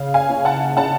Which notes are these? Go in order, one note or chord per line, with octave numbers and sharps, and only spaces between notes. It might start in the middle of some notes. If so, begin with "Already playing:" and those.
Already playing: C#3 F5
F5 G#5
C#4
F#5 A5
C#3 F#5 A5